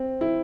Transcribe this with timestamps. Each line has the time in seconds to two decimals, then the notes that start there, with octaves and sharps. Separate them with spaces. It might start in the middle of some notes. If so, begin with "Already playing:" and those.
Already playing: C4
0.21 E4